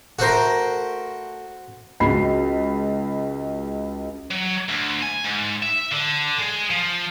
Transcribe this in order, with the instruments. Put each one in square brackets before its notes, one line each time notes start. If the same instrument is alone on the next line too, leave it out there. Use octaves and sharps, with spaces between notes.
[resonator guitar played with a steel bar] A3 A#4 [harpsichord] F#4 C5
[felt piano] C#2 F#4 B5 C7
[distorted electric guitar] F#3
D2
G#5
G#2
E5
D3
G#3
F3